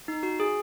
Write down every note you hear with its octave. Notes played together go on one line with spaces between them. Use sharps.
D#4
F#4
G#4